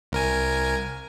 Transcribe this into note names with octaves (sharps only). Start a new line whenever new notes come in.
C2 A#4 G#5